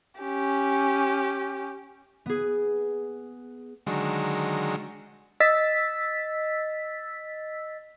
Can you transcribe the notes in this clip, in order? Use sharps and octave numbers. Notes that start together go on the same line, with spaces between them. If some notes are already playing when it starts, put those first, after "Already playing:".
C#4 G4
B3 G#4
D3 D#3 F#3 G#3
D#5 E6 A6 B6